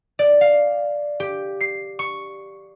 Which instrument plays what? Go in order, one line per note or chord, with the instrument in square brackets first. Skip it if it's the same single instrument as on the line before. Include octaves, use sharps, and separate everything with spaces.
[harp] D5
F5
G4
C7
C#6